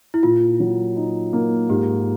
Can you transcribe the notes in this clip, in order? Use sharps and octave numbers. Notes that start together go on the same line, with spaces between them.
E4
A#2 F4
F#3
D#4
A#3
G#2 G4